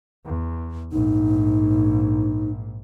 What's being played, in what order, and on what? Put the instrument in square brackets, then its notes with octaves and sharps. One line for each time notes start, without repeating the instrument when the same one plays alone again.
[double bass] E2
[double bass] A#1 G#2 [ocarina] D#4